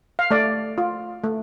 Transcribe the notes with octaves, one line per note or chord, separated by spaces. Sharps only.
F5
A3 D5
F4
A3